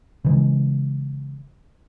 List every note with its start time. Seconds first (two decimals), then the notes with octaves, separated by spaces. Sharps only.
0.25 C#3 E3 G#3